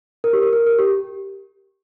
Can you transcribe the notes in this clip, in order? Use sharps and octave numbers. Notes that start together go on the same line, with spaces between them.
A#4
G4
A#4
A#4
A#4
G4